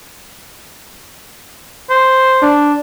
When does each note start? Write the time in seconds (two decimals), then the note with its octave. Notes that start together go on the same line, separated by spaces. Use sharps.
1.90 C5
2.43 D4